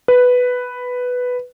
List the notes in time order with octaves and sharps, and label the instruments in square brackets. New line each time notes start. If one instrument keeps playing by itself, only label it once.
[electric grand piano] B4